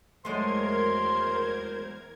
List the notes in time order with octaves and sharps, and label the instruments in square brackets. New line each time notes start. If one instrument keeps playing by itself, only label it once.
[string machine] E2 A#4 G#6 [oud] F#3 G#3 A3 [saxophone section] C5 [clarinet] C6